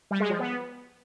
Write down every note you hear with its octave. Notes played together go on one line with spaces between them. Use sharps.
G3
G#3
F3
B3